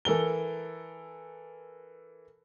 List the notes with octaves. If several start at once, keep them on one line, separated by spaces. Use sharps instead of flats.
E3 A4 A#4 G7